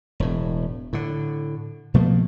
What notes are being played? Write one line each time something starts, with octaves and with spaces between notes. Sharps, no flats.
E1 A2
A2 D3
B2 F3 A3 A#3